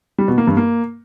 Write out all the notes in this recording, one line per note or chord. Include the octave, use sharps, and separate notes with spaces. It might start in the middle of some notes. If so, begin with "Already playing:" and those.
G3
B2
A#3
G2
A#3